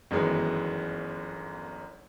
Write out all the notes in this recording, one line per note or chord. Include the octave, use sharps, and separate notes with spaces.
G1 F#2 D#3 E3 G#3 B3